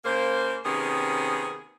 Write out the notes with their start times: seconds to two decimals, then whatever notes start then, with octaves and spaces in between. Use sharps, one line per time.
0.05 C#3 A#3 C5
0.65 C3 D#3 A#3 B3 C#4 G#4